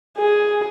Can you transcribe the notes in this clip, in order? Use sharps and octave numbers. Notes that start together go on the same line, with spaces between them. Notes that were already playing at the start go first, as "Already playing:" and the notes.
G#4